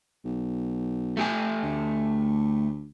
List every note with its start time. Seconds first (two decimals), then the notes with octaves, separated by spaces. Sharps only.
0.25 B1
1.17 A3 G4 G#5
1.63 D2